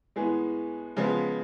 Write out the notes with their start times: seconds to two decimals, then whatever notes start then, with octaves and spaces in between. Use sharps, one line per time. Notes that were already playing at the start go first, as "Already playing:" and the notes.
0.16 A2 G#3 B3 G#4
0.96 C#3 F3 G#3 B3